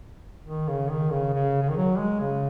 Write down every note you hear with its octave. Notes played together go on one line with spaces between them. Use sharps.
D#3
C#3
D#3
C#3
C#3
C#3
D#3
F#3
G#3
C#3